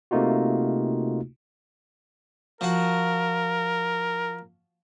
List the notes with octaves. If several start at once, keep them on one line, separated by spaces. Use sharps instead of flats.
C3 A3 A#3 D#4 F4 F#4
F3 F#4 A#4